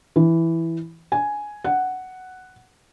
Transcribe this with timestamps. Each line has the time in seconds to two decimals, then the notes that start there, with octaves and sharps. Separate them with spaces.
0.16 E3
1.12 G#5
1.64 F#5